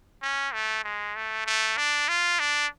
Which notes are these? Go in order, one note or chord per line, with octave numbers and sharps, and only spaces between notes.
C#4
A3
G#3
A3
A3
D4
F4
D4